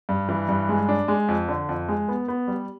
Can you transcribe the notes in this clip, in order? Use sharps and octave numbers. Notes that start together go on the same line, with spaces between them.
G2
E3
G2
G#3
D4
G#3
F2
D3
F2
G#3
B3
B3
G3